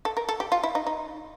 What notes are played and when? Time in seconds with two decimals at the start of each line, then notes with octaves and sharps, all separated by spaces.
0.05 A4
0.17 A#4
0.29 A4
0.40 G4
0.52 F4
0.63 E4
0.75 D#4
0.87 D#4